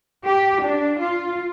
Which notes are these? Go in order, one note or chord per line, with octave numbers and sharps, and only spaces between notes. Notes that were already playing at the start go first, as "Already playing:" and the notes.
G4
D4
F4